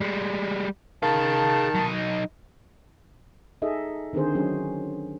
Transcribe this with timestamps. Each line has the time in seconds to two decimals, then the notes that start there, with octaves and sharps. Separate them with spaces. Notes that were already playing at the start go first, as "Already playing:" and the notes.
0.01 G3 G#3
1.03 D#3 G#4 F5 A5
1.75 F#3 D#4
3.62 D#4 G#4 A4 D#5 E5
4.13 D3 D#3 C4 G#4 C5
4.35 F#3 C#4 G#4